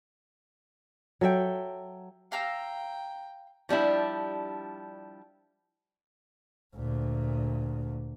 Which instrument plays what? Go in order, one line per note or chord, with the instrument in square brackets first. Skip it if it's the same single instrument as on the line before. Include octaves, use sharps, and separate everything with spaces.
[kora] F#3 A4 E5 G5
[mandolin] F5 A#5 E6 [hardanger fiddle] G5
[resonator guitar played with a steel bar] F3 G3 D4 E4
[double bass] D2 A#2